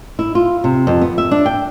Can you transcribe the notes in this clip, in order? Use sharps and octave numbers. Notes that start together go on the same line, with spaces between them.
E4
F4
C3
F2
B3
E5
D4
G5